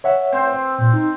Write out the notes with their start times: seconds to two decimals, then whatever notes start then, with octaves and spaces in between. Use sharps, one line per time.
0.04 C#5 E5 F#5
0.32 C4 C5
0.79 A#2
0.93 D#4